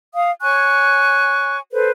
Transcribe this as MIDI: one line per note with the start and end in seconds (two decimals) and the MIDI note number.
0.14 0.31 77
0.14 0.31 87
0.42 1.57 73
0.42 1.57 80
0.42 1.57 85
0.42 1.57 90
1.71 1.90 69
1.71 1.90 71
1.71 1.90 72